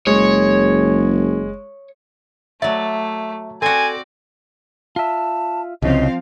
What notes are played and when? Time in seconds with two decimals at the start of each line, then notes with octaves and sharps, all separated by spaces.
0.07 F#1 G#3 C#5
2.62 F#3 A3 D5 E5
3.62 C4 F#4 A4 D5 G#5
4.96 F4 E5 A5
5.82 C2 C#3 F3 C4 D#5 F5